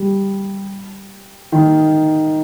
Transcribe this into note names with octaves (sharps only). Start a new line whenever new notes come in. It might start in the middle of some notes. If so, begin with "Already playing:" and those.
Already playing: G3
D#3